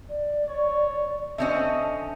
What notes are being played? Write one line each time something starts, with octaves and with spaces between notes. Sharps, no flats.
D5
C#5
D3 C4 C#4 D#5 E5 A5